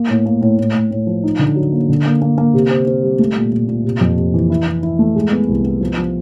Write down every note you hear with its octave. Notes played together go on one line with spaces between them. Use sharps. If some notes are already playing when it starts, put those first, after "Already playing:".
Already playing: A#3
A2
A#3
A2
A2
A2
A2
F3
D#4
D3
F#3
A#3
D3
A#3
A#3
A#3
C3
C4
C4
G3
A3
A#2
A#2
A#2
C3
F2
C3
E3
E4
E4
E4
A3
G#3
B3
C2
B3
F3
F3